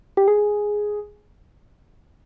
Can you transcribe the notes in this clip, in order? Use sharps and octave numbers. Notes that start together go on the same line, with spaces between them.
G4
G#4